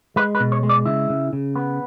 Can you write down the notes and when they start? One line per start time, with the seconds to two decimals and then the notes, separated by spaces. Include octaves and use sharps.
0.16 G#3 B4
0.35 B4
0.40 B2
0.52 C#5
0.63 G#3
0.69 D5
0.86 C#3 E4
1.10 C#3
1.33 C#3
1.56 B3